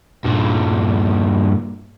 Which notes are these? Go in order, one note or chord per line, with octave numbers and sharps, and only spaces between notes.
G2 A#2